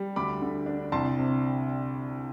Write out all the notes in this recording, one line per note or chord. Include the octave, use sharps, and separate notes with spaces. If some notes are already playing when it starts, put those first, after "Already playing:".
Already playing: G3
D2 B5 D6
D3
D4
C2 A5 C6
C3